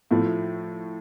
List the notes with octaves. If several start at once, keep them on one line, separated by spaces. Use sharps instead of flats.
A2 F3 A3